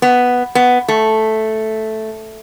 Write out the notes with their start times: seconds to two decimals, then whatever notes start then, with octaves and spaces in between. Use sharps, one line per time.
0.02 B3
0.55 B3
0.88 A3